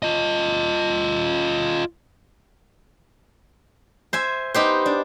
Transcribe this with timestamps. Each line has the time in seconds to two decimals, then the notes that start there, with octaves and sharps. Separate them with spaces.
0.03 F4 D#5
4.13 C5 E5 G#5
4.54 B3 D#4 G4 C5
4.86 D4